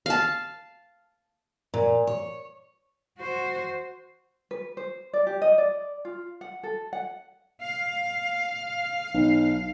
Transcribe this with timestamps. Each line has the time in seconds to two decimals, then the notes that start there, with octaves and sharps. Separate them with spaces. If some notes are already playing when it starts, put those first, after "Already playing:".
0.06 F5 A5
1.74 A#2
2.07 C#5
3.19 F#4 C5
4.51 B4
4.77 C5
5.13 D5
5.27 G4
5.42 D#5
5.58 D5
6.05 F4
6.41 F#5
6.63 A4
6.93 F#5
7.62 F5
9.14 B1